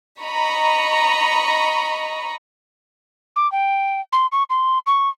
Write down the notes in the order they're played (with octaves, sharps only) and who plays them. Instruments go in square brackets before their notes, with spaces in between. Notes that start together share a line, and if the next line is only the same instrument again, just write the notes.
[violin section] D#5 A#5 B5 C#6
[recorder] D6
G5
C6
C#6
C6
C#6